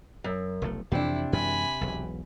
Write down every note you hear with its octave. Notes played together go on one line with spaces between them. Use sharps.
F#2
F1 B1 A3
F2 C3 E3 D4 E4
F#2 E3 G#3 G#5 B5
E1 B1